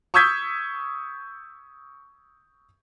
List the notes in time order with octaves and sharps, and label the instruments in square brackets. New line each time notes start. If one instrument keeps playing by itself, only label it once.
[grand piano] C#6 D#6 E6 G6 G#6 B6